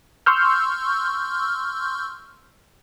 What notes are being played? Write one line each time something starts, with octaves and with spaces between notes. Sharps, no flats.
C6 C#6 E6 F6 G6